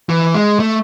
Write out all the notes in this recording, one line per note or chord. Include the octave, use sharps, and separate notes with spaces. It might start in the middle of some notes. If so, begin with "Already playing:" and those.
E3
G#3
A3